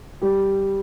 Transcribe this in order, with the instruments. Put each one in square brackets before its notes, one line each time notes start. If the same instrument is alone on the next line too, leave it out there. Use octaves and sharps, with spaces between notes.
[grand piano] G3 G4